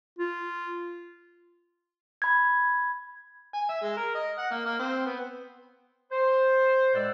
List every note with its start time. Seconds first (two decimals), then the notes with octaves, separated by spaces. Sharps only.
0.19 F4
2.22 B5 G#6
3.54 G#5
3.69 E5
3.82 G#3
3.97 A#4
4.15 D#5
4.38 F#5
4.51 A#3
4.65 A#3
4.79 C4
5.06 B3
6.12 C5
6.94 A2 G#3 A4 D5 F#5 E6